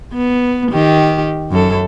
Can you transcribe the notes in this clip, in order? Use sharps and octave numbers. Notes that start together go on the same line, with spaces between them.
B3
D#3 G4
F#2 A4